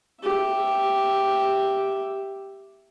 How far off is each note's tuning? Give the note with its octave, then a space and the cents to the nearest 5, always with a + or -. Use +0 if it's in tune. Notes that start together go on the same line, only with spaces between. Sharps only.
G4 +0 E5 +5